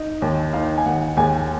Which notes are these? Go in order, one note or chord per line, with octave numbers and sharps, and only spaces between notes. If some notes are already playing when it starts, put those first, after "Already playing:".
Already playing: D#4
D#2
D#4 F5
G#5
D#2 F#5
D#2 G#4 G#5